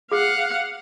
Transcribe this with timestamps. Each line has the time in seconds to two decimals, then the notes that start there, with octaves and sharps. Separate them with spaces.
0.12 G#4 F5 F#5